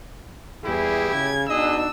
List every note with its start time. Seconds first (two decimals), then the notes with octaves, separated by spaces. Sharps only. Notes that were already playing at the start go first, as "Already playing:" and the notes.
0.64 E2 E3 G3 E4 G4 G#4
1.13 C#3 G#6
1.49 B2 D4 D#4 G#4 D#5 E6